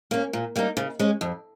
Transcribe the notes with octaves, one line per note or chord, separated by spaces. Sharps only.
A#3 C#4
A#2
G3 A#3 D#4
C#3
G#3 C#4
F2